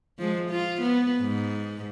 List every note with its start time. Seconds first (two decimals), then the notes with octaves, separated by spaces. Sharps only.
0.19 F3 G#3
0.50 F4
0.82 B3
1.21 G#2